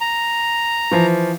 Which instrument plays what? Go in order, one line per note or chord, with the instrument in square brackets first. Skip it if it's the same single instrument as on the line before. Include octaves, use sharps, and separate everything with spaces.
[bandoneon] A#5
[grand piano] E3 F3